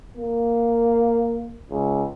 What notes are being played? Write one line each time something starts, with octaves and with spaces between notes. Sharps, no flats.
A#3
C#2